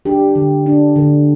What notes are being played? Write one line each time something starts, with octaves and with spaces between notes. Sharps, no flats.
D4 G4
D3
D4
D3